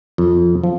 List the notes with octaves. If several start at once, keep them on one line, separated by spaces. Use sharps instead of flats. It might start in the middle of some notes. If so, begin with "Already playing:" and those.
F2
F3